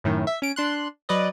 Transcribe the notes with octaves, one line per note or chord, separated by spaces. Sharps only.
F#2 A2 D#3
E5
C#4 D7
D4 C6 F#6
F#3 B4 D5 D#5